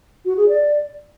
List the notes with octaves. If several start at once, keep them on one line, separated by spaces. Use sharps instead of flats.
F#4
G#4
D5